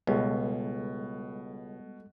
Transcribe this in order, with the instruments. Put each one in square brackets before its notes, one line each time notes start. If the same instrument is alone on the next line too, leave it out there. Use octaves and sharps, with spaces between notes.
[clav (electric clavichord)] C#2 [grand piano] B2 [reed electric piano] G3 G#3 A4